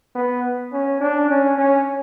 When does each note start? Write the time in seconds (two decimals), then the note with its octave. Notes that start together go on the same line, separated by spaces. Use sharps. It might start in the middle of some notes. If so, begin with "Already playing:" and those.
0.15 B3
0.72 C#4
1.01 D4
1.29 C#4
1.58 C#4